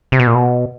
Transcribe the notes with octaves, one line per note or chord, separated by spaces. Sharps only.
C3
B2
A#2
B2